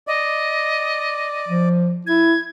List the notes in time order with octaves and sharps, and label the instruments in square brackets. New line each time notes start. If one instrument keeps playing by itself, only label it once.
[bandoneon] D5 [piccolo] D#5
[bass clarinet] F3
[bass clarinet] E4 [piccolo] G#6